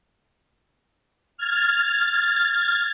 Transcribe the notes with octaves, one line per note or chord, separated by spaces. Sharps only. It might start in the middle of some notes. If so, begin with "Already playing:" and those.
F6 G#6 A6